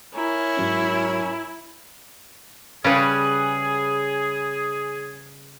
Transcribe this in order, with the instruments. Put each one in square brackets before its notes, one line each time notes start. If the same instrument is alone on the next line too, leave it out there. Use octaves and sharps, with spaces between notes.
[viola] E4 [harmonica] A#4 C#5 G#5
[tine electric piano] G#2 F#3 C#4
[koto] C#3 G3 [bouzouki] C#4 B4 [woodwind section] G#4